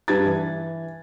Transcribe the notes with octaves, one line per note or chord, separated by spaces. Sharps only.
G2 G3 B4 A5 G#6 A6
E3